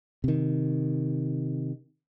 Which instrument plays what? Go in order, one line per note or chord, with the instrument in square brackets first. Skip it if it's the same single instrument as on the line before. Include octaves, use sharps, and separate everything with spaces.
[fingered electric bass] C3 D#3